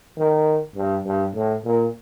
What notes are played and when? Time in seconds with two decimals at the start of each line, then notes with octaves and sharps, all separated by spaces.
0.17 D#3
0.76 G2
1.05 G2
1.34 A2
1.64 A#2